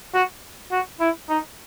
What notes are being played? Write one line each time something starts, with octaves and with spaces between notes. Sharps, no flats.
F#4
F#4
E4
D#4